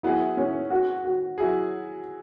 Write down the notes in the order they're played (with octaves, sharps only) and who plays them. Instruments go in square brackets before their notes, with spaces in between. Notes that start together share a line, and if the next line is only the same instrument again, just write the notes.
[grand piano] F#3 B3 G#4 [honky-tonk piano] E4
[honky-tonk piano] C#4
F#4
F#4
[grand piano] F#3 E4 G#4